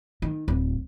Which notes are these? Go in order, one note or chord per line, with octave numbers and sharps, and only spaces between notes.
D#3
D1